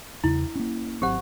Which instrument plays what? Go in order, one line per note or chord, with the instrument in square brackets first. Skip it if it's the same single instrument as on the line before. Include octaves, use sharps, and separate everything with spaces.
[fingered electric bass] E2 C#3 [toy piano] E4
[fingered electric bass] A#3 C#4
[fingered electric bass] G#1 F#3 C4 [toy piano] G4 C5 F#5